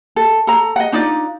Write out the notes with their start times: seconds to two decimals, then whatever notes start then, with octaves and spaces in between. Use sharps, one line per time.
0.16 A4
0.47 A4 A#5
0.76 D#5 F#5
0.92 D4 D#4 F4 D5